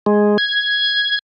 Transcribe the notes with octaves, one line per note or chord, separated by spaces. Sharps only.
G#3
G#6